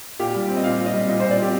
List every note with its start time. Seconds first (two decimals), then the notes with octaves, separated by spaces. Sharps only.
0.20 A#2 G4
0.35 G3
0.49 C4
0.57 D#5
0.64 A#2 F5
0.79 A#2
0.86 D#5
0.94 G3
1.09 A#2 D#5
1.20 C5
1.23 A#2
1.31 D5
1.39 C4 G4